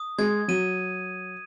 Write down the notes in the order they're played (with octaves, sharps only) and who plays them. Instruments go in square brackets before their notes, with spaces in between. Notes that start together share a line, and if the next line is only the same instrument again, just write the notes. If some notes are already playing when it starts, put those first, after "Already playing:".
Already playing: [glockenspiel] D#6
[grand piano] G#3 [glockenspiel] G#6
[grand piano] F#3 [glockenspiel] D#7